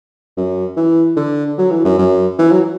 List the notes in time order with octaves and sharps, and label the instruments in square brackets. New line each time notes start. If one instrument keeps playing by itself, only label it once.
[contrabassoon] F#2
E3
D3
F#3
E3
F#2
F#2
E3
F#3